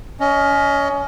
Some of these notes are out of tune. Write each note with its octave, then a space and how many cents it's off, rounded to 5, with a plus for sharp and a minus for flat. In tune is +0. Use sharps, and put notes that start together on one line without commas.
C#4 +25 D#5 +0